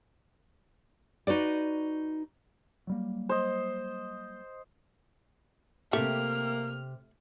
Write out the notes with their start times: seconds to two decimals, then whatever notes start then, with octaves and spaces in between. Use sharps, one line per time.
1.27 D#4 F#4 B4 D5
2.87 F#3 G3 A#3
3.29 C5 D#5
5.93 C3 A3 A#3 G4 F6